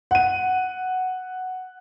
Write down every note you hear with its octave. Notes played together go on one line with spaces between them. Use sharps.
F#5 D#7